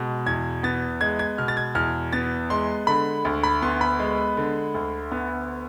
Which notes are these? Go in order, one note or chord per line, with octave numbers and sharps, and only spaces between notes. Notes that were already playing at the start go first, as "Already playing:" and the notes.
Already playing: B2 G#3
E2 G#6
B3 A6
G#3 G#6
G#6
B2 F6
A6
G#6
E2 F6
B3 A6
G#3 C6
D3 B5
D2
B5
B3 C6
B5
G#3
D3
D2
B3